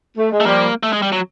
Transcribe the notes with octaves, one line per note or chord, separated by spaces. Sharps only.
A3
G#3
A3
F3 G3 A#3
A3
G#3
G3
F#3